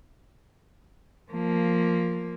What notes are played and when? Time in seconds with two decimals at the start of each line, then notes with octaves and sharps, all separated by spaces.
1.31 F3 A#3